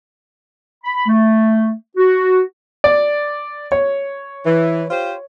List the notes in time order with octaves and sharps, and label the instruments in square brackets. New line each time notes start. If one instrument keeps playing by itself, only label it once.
[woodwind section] B5
A3
F#4
[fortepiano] D5
C#5
[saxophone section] E3
F4 G4 C5